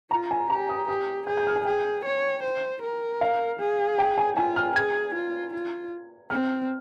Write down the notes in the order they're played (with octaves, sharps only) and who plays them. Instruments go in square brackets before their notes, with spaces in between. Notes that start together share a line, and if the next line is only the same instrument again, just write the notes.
[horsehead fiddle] F4 [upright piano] A#5
[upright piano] G#5
[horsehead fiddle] G4 [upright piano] A#5
[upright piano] D#6
[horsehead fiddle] G4 [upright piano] D#6
[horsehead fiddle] G#4 [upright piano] G6
[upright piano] G6
F6
G#5
[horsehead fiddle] G#4 [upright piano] G5
[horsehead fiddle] C#5
C5
A#4
[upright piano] F5
[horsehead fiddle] G#4
[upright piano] G5
G#5
[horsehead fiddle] F4 [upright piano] G#5
[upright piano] F6
[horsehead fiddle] G#4 [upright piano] G#6
[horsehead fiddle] F4
F4
[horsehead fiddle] C4 [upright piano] F6